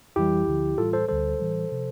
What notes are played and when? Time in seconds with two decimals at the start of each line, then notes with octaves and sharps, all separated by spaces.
0.16 F2 E3 G3 E4 G4
0.47 D2 D3 F3
0.78 A2 E3 G3 F4 A4
0.93 A4 C5
1.08 D2 D3 G3 A4 C5
1.40 A2 E3 G3
1.72 C3 F3